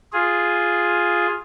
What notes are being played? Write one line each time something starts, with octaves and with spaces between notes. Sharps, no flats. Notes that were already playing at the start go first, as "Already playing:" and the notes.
F4 G#4